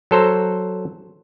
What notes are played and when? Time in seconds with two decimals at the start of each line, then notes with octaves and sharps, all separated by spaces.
0.11 F#3 A4 C5 A#5